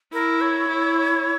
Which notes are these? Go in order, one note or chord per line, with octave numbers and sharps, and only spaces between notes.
E4 A#4
C#5
E4